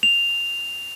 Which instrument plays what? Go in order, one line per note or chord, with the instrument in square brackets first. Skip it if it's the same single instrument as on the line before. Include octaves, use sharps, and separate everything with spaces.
[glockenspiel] F7